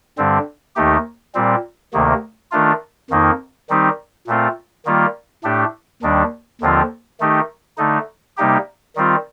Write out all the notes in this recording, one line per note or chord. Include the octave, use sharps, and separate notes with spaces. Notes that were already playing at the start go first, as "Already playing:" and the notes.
G2 D3 G3 C4
D#2 D#3 A3 D#4 G4
A#2 G3 C4
D2 C3 D#3 A#3
D#3 A3 D4 F4
F2 D#3 A#3 D#4
D#3 G3 C4 D#4 G4
A#2 A3 C4 F4
D#3 G3 A#3 F4
A2 A3 D4 G4
D#2 D#3 G3 D4
D#2 D3 F3 C4 F4
D#3 A3 D#4 G4
D3 A3 D#4
C3 G3 A#3 D#4 G4
D#3 G3 C4 F4